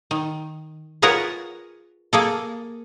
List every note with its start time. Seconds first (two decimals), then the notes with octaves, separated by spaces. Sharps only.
0.11 D#3
1.02 F4 G#4 A#4 B4 C#5 F#5
2.13 A#3 G#4 A4